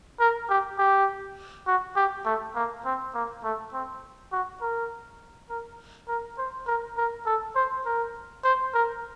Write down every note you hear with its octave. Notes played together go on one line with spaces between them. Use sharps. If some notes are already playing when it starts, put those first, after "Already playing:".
A#4
G4
G4
F#4
G4
A3
A#3
C4
A#3
A3
C4
F#4
A#4
A#4
A#4
C5
A#4
A#4
A4
C5
A#4
C5
A#4